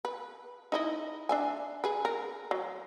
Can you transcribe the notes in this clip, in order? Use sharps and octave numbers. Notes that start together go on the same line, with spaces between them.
B4
D#4 E4 D#5
D4 E5 G#5
G#4 B4
A#4
F#3